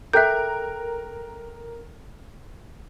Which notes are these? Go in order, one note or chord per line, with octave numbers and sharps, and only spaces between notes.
A4 A#4 E5 G5 F#6 G6